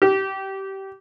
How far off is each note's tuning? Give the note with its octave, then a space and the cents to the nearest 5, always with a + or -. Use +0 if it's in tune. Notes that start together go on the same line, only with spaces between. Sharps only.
G4 -20